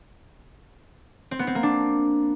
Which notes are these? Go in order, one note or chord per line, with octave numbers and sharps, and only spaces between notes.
C4
B3
C4
A#3
D4